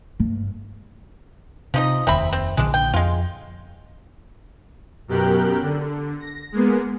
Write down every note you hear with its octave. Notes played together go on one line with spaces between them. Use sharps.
G2
C3 F3 D#4 D#5
F1 D#2 C4 E5 B5
C4
A#1 A#2 D3 G#3 D4
G5
F2 G#3 F4
F#2 B2 G4 A#4 F#6 G6
D3
A#6
G#3 A#3 B3